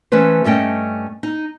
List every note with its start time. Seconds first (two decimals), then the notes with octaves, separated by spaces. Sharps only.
0.12 E3 A3 C#4 B4 C5
0.44 G2 A3 C#4 D#5 G5
1.23 D#4